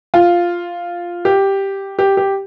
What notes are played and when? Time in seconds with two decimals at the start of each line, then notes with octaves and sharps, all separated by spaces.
0.14 F4
1.25 G4
1.99 G4
2.17 G4